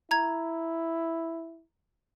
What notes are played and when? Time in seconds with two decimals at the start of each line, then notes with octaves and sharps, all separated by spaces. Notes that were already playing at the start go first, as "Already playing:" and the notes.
0.11 E4 A#5 G#6